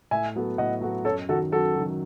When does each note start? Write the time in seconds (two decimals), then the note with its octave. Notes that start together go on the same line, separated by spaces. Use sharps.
0.11 A2 E5 G#5
0.35 F#3 B3 F#4 A4
0.58 A2 D#5 F#5
0.81 F#3 B3 F#4 A4
1.05 F#2 A4 C#5
1.29 D#3 F#3 F#4 A4
1.52 F#2 F#4 A4
1.75 D#3 F#3